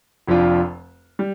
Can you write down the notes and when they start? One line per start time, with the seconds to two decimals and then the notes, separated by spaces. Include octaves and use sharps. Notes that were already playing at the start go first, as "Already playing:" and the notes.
0.28 F1 F2 F3 D4 F4
1.19 G3